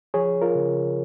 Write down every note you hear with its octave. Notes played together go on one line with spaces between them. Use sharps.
F3 G#4 C#5
F4 A#4
C#3